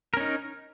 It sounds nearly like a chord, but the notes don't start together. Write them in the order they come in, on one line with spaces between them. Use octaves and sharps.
A#4 C#4 D#4